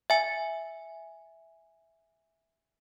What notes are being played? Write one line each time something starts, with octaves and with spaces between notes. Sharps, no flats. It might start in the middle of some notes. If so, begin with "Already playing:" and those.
E5 G#5